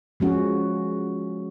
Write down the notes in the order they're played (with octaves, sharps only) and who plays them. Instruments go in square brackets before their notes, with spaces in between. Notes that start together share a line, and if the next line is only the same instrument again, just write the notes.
[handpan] F3 G#3 C#4 F#4